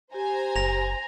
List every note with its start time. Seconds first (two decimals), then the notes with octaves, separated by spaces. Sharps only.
0.14 G4 C5 G#5 A#5
0.56 F#1 A#6 F7